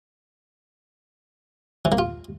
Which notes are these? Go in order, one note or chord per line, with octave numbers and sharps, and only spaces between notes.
E3
A#3
F4